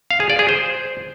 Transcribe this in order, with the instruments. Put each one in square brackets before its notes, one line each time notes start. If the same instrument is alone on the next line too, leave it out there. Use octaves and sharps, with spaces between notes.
[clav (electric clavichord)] F5
G#4
D5
G#4
C5